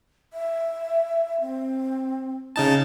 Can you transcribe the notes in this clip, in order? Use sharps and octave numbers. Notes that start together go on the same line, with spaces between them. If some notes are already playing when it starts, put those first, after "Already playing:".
E5
C4
C#3 D#4 A5